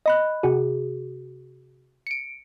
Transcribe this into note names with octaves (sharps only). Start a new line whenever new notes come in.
D#5 B5 F#6
C3 F#4 G#4
C#7 D7